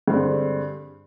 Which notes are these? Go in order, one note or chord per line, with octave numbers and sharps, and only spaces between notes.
G2 D3 G#3 C4